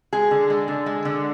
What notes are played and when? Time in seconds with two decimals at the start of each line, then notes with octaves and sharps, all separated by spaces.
0.13 G#3 G#4
0.31 D3
0.50 G#3
0.68 D3
0.86 G#3
1.05 D3